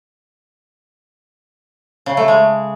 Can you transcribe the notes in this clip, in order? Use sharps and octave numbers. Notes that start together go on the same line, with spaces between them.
C#3
A3
G#3